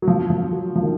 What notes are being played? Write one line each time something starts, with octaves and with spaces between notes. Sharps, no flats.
F#3
F3
F3
F#3
F3
D#3